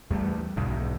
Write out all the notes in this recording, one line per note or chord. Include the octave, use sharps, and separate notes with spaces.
E2 G3 A3
B1 E2 G#2